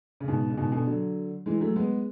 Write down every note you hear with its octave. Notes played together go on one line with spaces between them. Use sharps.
C#3
G#2 B2
C#3
G#2 B2
B2 D3
D3 F#3
E3 G#3
F#3 A3
G#3 B3